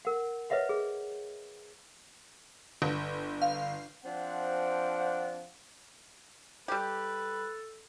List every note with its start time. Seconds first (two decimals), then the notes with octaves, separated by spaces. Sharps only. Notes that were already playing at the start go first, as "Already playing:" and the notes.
0.05 A#4 F#5
0.50 B4 C#5 D#5 E5 F#5
0.69 G#4
2.82 G1
3.42 F5
4.05 F3 C4 D4 F#5
6.68 G3 G4 A4 B4